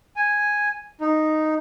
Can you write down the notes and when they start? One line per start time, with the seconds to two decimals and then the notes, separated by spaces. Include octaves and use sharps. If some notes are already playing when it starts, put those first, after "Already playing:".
0.16 G#5
1.01 D#4